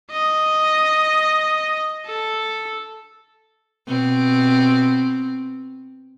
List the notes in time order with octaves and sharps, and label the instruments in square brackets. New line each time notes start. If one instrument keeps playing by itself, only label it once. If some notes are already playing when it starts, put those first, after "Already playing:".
[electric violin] D#5
A4
[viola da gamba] B2 C4